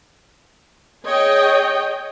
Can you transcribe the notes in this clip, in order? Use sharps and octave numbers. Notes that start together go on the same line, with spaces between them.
G#4 C#5 D#5 G5